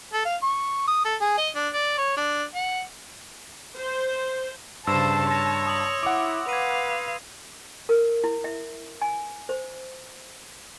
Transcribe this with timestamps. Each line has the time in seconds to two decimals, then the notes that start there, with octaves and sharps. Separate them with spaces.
0.13 A4
0.25 F5
0.43 C#6
0.88 D#6
1.05 A4
1.22 G#4
1.38 D#5
1.56 D4
1.74 D5
1.98 C#5
2.17 D4
2.55 F#5
3.76 C5
4.87 G2 C#3 C5 A5 E6 E7
5.27 C#5 C6 A#6
5.67 D#6 F#7
6.03 E4 F#5 D6
6.49 B4 F5 G#6 D#7
7.89 A#4
8.24 E4
8.44 E5
9.02 G#5
9.49 C5